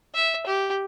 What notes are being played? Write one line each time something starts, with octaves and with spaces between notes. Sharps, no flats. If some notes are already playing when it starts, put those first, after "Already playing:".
E5
G4